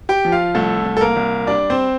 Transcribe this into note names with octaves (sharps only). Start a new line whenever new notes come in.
G4 G5
F3
F4 F5
C2 A3 A4
C2
A4
A#3 A#4
C2
G3 D4 D5
C4 C5